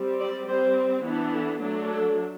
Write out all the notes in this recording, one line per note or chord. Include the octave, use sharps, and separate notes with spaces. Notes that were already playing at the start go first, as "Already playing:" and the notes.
Already playing: G3 C4
D5
G3 C4 C5
E3 B3 D4
A4
F#3 A3 D4
A4